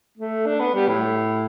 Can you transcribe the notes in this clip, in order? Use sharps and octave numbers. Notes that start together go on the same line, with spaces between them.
A3
D4
B3
G3
A2